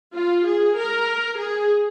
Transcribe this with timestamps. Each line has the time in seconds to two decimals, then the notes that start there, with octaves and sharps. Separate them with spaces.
0.14 F4
0.45 G#4
0.77 A#4
1.38 G#4